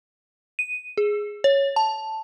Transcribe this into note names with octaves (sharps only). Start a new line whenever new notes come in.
D#7
G#4
C#5
A5